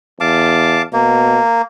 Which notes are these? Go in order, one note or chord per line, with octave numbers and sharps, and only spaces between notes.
E2 F5 A5 D6
B2 A#3